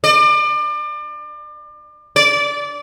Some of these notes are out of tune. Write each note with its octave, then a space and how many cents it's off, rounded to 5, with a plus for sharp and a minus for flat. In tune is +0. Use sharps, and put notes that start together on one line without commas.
D5 +35
D5 -20